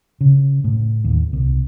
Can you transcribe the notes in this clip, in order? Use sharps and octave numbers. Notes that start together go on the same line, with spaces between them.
C#3
A2
D#2
C2